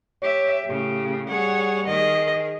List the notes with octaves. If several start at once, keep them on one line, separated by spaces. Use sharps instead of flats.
G4 C#5 E5
A2 C#3 G4
G3 G#4 C#5 F#5
D#3 G#4 D#5